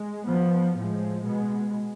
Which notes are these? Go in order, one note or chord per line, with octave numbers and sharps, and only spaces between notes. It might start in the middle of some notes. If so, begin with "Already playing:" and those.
Already playing: G#3
F3 B3
A2 F3 G#3
B2 G#3 B3